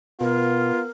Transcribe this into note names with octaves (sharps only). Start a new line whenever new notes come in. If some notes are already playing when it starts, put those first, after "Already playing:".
B2 B3 F4 A#4